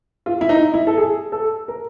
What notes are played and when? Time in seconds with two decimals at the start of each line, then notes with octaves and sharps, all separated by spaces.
0.26 F4
0.41 E4
0.49 D#4
0.74 E4
0.87 A4
0.97 G#4
1.32 A4
1.68 A#4